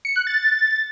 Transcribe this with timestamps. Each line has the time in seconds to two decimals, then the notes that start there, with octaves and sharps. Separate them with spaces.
0.05 C#7
0.16 F#6
0.27 A6